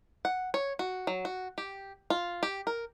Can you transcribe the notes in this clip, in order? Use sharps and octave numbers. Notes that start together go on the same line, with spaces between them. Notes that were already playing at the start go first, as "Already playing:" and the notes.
F#5
C#5
F#4
F#3
F#4
G4
F4
G4
A#4